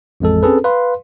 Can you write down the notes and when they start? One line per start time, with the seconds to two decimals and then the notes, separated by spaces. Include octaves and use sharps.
0.20 A1 F2 G#3 A4
0.43 C4 C#4 G#4 A4 B4
0.64 B4 F5 C6